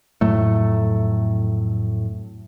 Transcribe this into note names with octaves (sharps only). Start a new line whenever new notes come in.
F2 A2 F#3 A3